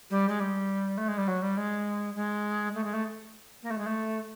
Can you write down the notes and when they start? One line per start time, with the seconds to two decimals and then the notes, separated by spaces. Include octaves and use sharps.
0.10 G3
0.28 G#3
0.39 G3
0.97 A3
1.08 G#3
1.17 G3
1.27 F#3
1.42 G3
1.57 G#3
2.15 G#3
2.74 A3
2.83 G#3
2.93 A3
3.62 A#3
3.70 A3
3.78 G#3
3.86 A3